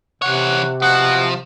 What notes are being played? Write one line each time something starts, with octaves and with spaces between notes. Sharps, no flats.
C3 E3 C#5 F#5
B2 F3 F#4 F#5